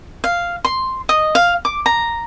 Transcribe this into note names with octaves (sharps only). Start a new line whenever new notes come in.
F5
C6
D#5
F5
D6
A#5